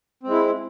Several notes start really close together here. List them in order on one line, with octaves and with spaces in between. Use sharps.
C4 G#3 E4